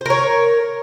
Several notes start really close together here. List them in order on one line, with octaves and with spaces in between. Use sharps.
C5 A#4 C#5